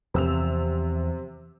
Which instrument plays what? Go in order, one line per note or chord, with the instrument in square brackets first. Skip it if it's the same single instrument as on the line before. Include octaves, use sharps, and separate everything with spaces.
[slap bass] E2 F3 [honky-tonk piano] C3 E6 F7